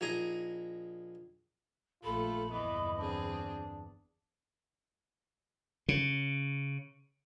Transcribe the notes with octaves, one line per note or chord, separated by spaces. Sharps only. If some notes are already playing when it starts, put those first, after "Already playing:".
A#1 D#4 G#4 A#5
A#1 A3 F4 A4 B5
G1 E2 E3 B3 D#5
C4 D4 G#4
C#3